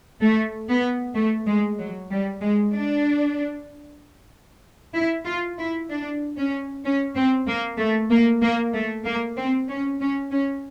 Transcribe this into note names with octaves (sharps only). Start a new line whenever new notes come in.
A3
B3
A3
G#3
F#3
G3
G#3
D4
E4
F4
E4
D4
C#4
C#4
C4
A#3
A3
A#3
A#3
A3
A#3
C4
C#4
C#4
C#4